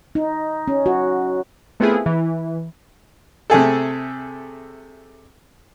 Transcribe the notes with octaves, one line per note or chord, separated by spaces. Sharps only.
D#4
C#4
F#4
A3 B3 C4 E4 F4 G#4
E3
C3 A3 G#4 A4